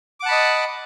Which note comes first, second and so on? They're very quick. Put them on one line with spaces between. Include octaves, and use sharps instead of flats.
D6 F#5 A5 B5 D#5